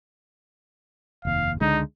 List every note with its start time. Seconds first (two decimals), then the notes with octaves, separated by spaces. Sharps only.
1.25 F1 D#2 F5
1.61 C#2 D3 G#3 D#4